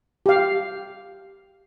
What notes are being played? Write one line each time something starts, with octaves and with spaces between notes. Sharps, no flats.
G4 F5